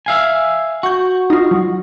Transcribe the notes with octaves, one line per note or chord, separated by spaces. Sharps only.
E5 F5 G#5
F#4 C#6 G6
D#4 F4
F#3